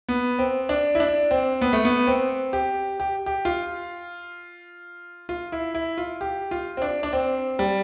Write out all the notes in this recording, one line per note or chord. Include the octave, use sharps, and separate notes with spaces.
B3
C4
D4
E4
D4
C4
B3
A3
B3
C4
G4
G4
G4
F4
F4
E4
E4
F4
G4
F4
C4
D4
D4
C4
G3